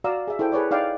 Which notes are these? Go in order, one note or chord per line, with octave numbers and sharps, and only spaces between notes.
F#4 D5 F5 A#5 E6
G#4 E5
E4 A4 C5 G5
G#4 B4 C#5 D5
D#4 G#4 D5 F5 G5